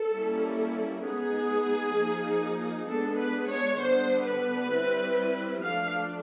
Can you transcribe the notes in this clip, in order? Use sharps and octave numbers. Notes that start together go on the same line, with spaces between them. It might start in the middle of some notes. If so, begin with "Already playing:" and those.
Already playing: A4
G3 A#3 C#4 E4
G#3 B3 D#4 G#4
F3 A#3 D#4
G#3 B3 D4 A4
B4
C#5
D3 G3 B3 D4 C5
B4
G3 C4 E4
F3 A3 D4 F5